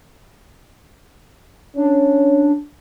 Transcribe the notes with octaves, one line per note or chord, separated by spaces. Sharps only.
C#4 D4